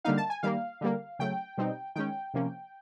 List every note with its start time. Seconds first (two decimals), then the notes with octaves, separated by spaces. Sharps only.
0.05 D3 G3 A#3 D#4 F5
0.17 A5
0.30 G#5
0.43 D#3 G3 A#3 F5
0.81 D3 G3 A#3
1.19 C#3 F#3 A3 G5
1.57 B2 G3 C4 D#4
1.96 D#3 G#3 C#4 G5
2.34 C3 F3 A#3 C#4